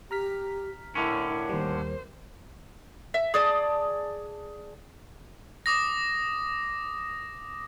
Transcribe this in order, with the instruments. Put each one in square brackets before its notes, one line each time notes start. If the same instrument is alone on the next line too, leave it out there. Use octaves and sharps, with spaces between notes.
[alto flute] G4 [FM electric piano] A#5 F6 B6
[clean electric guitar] A2 D3 C#4 [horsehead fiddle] E4 [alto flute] A#4
[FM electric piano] D#2 G3 [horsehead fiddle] C5
[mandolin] E5
G#4 D5 A5 D#6
[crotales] D6 D#6 A#6